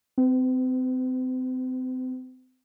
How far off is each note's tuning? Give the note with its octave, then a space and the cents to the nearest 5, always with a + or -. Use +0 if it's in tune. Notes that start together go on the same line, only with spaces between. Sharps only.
C4 -35 B4 +40